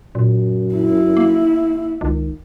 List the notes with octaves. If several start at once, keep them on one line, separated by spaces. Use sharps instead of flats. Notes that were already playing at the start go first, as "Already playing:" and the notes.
F#2 A#2
E4
A#3
C#2 D#3